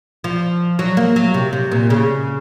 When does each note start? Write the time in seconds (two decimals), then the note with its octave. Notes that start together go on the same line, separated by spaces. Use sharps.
0.24 F3
0.79 F#3
0.97 A#3
1.16 F#3
1.34 C3
1.53 C3
1.72 A#2
1.90 C#3